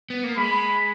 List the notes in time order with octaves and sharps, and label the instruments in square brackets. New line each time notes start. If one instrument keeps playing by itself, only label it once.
[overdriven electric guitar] B3
A#3
[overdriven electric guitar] G#3 [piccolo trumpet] B5